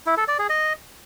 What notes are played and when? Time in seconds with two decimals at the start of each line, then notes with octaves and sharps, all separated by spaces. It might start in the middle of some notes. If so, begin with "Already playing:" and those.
0.07 E4
0.17 A4
0.28 D5
0.39 G#4
0.50 D#5